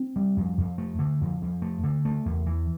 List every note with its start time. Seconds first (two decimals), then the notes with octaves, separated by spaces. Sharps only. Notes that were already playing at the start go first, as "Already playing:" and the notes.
Already playing: C4
0.16 G3
0.37 F2
0.58 F2
0.78 A3
0.99 D3
1.21 F2
1.42 F2
1.62 A3
1.84 D3
2.05 A3
2.26 E2
2.46 E3